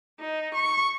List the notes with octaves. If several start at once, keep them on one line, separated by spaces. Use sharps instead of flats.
D#4
C#6